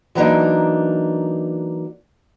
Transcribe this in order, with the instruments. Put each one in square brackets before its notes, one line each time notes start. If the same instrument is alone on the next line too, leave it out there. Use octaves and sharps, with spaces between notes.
[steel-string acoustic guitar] E3 F#3 G3 A#3 D4 D#4